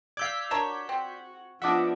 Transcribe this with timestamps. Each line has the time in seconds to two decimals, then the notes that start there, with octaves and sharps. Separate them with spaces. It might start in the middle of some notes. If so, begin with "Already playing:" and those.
0.17 D5 F5 E6 G6 G#6 B6
0.51 D4 F#4 A#4 C#5 E7
0.89 C4
1.62 F3 B3 D4 D#5 E5 F#5 D6 D#6